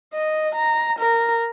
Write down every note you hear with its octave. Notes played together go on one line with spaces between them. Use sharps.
D#5
A#5
A#4